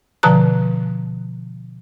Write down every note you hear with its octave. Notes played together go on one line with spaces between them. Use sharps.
B2 D3 F3 A5 A#5 F#6